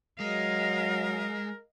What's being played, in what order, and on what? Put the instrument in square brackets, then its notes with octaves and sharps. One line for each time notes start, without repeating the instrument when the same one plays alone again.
[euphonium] F#3 [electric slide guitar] G#3 [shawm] A#4 [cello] D#5 F5